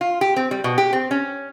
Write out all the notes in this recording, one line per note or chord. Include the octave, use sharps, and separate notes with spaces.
F4
G4
C4
G3
B2
G4
C4
C#4